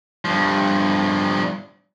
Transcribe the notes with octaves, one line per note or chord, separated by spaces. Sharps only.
G2 F3